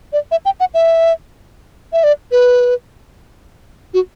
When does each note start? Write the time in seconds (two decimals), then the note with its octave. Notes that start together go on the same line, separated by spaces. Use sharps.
0.13 D5
0.31 E5
0.45 G5
0.60 F#5
0.74 E5
1.93 E5
2.04 D5
2.31 B4
3.94 F#4